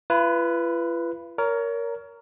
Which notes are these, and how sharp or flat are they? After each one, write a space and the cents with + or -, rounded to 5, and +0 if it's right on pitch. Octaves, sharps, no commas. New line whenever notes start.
F4 -45 B4 +0
A#4 +0 C#5 +30